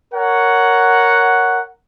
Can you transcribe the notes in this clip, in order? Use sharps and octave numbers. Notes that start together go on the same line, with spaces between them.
A#4 C#5 F#5